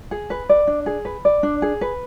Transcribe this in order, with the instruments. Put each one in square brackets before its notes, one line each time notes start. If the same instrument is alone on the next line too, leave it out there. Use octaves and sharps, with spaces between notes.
[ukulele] G#4
B4
D5
D4
G#4
B4
D5
D4
G#4
B4